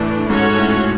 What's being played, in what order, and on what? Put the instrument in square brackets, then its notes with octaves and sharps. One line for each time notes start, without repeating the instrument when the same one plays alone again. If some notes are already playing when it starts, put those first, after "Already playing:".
Already playing: [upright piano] A2 [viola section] E3 A3 D4
[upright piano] G#2 [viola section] C#4 F#4 A4 C#5
[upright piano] A2